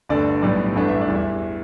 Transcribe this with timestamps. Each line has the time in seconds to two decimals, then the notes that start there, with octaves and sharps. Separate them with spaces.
0.09 G1 G2 D3 A3 D4 D5
0.42 B1 A2 G3 B3 D5
0.75 A1 G2 E3 A3 D4
0.88 E5
1.01 D5
1.08 E2 E3 G3
1.15 E5